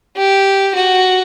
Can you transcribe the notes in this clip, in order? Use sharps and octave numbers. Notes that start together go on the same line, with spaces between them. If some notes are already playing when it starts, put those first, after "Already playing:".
G4
F#4